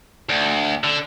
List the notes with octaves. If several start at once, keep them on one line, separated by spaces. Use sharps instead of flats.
D2
D3